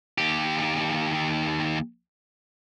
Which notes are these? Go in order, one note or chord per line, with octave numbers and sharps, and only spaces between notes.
D#2 G4